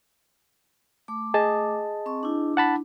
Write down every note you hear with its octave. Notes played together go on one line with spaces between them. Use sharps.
A3 D6
G#4 D#5 A5
C4 C#6
D4 E4
F#5 A5 B5